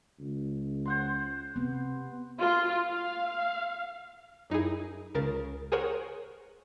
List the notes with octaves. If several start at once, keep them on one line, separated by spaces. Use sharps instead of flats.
C#2
C5 F#5 C6
C3 B3
F4
F5
F#2 D#4 E4 G#4
C#2 C#3 A#4 A6
G#4 A#4 C5 C#5 F#5